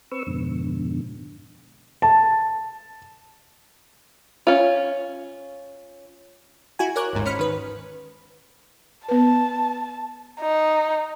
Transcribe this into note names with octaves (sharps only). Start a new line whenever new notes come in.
C4 B4 C#6 E6
F2 G#2 B2 D3
A5
C#4 F4
E4 F#4 G#5
A#4 C#5 D6 F#6
G1 D#2 G#2
C#4 C5 B5 F6 C#7
D#3 B4
B3 B4 A5
D#4